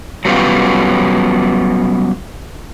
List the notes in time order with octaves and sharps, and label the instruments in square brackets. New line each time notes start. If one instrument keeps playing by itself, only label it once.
[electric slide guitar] F#3 G3 B3 C#4 F4